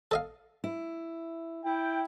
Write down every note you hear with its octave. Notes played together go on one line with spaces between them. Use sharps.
A4 D#5 F5
E4
E4 G5